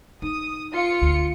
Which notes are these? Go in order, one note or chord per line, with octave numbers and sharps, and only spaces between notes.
D#4 D#6
F4 C#7
D2